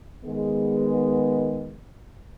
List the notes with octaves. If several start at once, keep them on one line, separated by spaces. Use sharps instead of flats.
D#3 G#3 B3